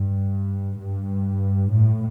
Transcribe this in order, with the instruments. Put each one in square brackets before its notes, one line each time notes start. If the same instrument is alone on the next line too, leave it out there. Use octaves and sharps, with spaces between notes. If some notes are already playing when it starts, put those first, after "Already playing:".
Already playing: [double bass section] G2
G2
A2